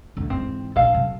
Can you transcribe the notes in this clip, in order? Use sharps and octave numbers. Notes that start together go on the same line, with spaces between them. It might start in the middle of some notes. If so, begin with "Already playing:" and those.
A1 D2
G#2 E3 C4
A#1 F3 A4 F5
C3 F#3